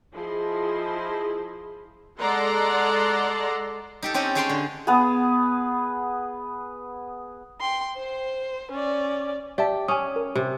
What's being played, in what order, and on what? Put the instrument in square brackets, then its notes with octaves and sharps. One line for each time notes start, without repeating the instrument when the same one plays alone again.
[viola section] F3 E4 G#4 D#5 C6
G#3 A4 D5 F#5 A#5 C6
[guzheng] D#4 G4 A4
C4 C#4 G4 A4 D#5
C#4 G#4 C#5 G5 A5 C6
D3
[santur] B3 G#4
[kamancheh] G5 C6
C5
C#4 D5
[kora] G4 [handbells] D5 E5 A5
[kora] C#4 [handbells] G#5 D#6
[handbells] A#4
[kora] C3